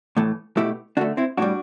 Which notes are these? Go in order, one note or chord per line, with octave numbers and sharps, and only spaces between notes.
A2 E3 A3
B2 A3 E4 G4
D3 A3 D4 F#4
C4 E4
A2 G3 D4 F#4